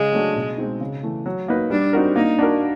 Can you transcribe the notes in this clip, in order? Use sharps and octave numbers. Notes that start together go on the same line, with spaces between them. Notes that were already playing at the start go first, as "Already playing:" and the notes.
Already playing: C#3 G#3
F#3 A3 D4 F#4
B2
G#3 C4 D#4
C#3
E3 A3
F#3
A#3 D#4 F#4 B4
G3 D4
C4 D#4 F#4 A#4
A#3 D#4
D4 F#4 A#4